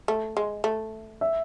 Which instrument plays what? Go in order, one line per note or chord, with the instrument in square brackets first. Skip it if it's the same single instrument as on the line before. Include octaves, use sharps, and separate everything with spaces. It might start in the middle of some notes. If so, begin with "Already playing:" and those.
[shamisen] A3
G#3
A3
[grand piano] E5